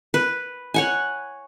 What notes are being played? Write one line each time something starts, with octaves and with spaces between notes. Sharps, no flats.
B4
C#5 F#5 G#5